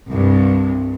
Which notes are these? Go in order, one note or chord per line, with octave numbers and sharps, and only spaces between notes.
C2 G2